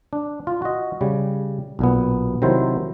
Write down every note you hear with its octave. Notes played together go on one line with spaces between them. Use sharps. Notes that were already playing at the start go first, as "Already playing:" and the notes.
D4
F4
F#4 D#5
C#3 G3
B1 A#2 B3
C3 D#3 F#3 E4 C5